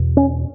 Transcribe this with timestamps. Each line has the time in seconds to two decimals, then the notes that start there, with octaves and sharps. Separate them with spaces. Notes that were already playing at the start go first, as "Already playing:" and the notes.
Already playing: E2 B2
0.17 C#4